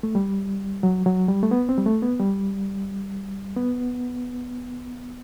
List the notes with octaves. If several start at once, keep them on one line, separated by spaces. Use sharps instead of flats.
A3
G3
F#3
F#3
G3
A3
B3
C4
G3
A3
B3
G3
B3